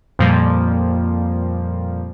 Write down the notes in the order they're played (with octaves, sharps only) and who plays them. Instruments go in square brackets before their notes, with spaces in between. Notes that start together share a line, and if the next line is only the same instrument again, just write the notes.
[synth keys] F2 A#2 F3 G3 A#3